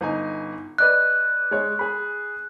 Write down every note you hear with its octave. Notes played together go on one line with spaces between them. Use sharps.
G1 D#4 G#5
B4 D5 D#5 F#6
G#3 C#5
G#4 B5